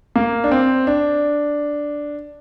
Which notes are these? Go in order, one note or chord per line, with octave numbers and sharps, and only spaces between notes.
A#3
D4
C4
D4